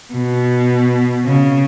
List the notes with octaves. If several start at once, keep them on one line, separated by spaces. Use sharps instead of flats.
B2
C#3